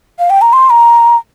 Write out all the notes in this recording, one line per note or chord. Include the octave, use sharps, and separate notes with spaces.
F5
G5
A#5
C6
A#5